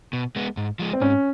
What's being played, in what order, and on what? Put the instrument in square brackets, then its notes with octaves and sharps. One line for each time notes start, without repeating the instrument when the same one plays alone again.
[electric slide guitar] B2
G#3 B3
G#2
F3 G#3
[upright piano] C4
[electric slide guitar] G#2 [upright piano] C#4